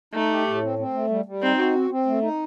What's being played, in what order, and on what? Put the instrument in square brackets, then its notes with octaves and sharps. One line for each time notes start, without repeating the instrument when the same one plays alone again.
[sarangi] A3 [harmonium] D#4
[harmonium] G4
A2
C4
C4
A3
G3
G3
[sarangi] C4 [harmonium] D#4
[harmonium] F#4
C4
C4
A3
D#4